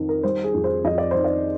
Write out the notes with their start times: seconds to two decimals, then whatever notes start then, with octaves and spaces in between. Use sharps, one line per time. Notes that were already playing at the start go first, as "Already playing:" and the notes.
Already playing: F2 D#3
0.09 A#4
0.23 G3 C5
0.44 G#4
0.54 F2
0.64 C5
0.84 F2 D#5
0.98 D5
1.11 D#3 C5
1.24 D5